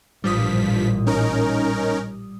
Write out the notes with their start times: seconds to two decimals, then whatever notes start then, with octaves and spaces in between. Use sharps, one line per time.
0.24 A1 G2 A#2 F3 G3 D#6 B6
1.07 C#4 D#4 A#4